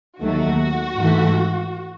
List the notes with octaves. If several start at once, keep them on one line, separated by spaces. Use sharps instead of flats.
D#2 D#3 F#3 A3 F#4
G#2 E3 A3